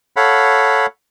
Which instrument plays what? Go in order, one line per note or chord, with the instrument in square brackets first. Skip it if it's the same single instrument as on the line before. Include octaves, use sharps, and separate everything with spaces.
[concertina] A4 C#5 F5 F#5 B5